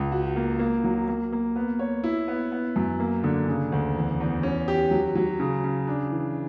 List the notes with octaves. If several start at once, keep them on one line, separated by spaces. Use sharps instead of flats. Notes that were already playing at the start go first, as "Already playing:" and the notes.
Already playing: C#2
F#4
A#3
A#3
F#3
A#3
A#3
B3
C#5
E4
B3
B3
F#2
A#3
D3
C#3
D2
E2
E2
C#4
G4
F#3
F#3
C#3
C#3
D4
E3